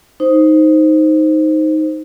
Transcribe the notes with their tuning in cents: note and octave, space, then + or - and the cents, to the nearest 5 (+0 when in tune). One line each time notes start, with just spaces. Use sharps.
D#4 +10 C5 +0